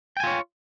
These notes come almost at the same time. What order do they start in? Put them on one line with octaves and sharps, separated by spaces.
G5 G#5 F4 C#5